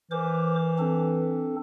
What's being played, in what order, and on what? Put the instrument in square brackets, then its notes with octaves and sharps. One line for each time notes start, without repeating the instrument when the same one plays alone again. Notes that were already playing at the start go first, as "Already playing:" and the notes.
[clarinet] E3 [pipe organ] A#4 C5 D6
[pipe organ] C4 D4 A4